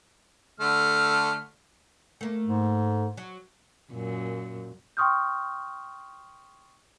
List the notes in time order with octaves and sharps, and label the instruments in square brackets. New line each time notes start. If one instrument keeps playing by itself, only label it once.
[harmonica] D3 A3 F6
[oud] A3 A#3
[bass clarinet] G#2
[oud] F#3
[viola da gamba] F#2 A#2
[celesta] G5 C6 C#6 D#6 F6 G6